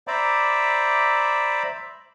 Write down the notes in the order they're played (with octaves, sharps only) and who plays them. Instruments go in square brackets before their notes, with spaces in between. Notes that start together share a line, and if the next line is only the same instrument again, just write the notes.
[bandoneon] C5 D5 E5 A#5 B5 D6